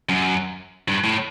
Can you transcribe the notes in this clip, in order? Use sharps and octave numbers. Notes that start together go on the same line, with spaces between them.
F#2
G2
A2